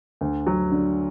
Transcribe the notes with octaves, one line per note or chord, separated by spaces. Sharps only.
D2
F#3
D3